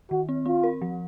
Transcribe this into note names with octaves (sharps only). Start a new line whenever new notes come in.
D#3 F#4
C4
C4 F4
A#4
F3